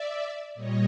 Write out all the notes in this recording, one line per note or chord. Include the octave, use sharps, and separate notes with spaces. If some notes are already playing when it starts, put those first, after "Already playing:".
Already playing: D5 E5
A#2 G3 C#5 D#5